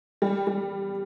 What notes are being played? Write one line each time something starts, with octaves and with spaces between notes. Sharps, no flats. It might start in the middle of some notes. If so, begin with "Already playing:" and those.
G3
G3